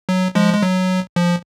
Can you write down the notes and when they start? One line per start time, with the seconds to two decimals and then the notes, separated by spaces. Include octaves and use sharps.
0.09 F#3
0.35 F3 G#3
0.54 G#3
0.62 F#3
1.16 F3